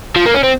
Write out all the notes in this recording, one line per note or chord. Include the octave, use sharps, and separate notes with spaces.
F3
A#3
C#4
C4